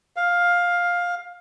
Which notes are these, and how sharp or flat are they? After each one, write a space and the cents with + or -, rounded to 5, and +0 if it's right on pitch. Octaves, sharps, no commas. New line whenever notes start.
F5 +10